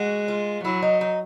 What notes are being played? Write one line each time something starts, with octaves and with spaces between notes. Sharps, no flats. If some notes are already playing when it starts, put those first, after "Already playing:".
Already playing: G#3 F#4
F4
F#3 E4
D#4
D#4